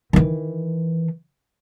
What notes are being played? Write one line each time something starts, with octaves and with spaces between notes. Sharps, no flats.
D#3 E3